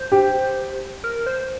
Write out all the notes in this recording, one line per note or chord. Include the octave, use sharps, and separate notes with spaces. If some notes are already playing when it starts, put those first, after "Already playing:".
Already playing: C5
G4
A#4
C5